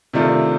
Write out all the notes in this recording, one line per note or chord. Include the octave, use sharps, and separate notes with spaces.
C3 D#3 A3 D4 F4